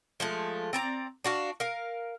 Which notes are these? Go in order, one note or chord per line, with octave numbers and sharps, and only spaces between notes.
F3 G#3 A3
C4 D5 A#5
D4 F#4 F5
A#4 F5